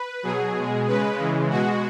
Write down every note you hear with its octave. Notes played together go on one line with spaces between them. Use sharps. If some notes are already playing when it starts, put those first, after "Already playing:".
Already playing: B4
B2 F#3 G#4
B2 G#3
C#3 G#3 B4
C#3 E3 G#3
B2 G#3 F#4